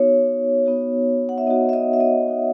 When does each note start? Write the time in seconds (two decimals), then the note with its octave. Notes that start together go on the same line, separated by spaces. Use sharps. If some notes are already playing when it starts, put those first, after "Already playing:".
Already playing: B3 D#4 F#4 C#5
0.66 B3 D#4 F#4
1.29 F#5
1.38 E5
1.47 B3 D#4 F#4 D#5
1.69 E5
1.73 D#5
1.93 E5
2.00 D#5
2.28 B3 D#4 F#4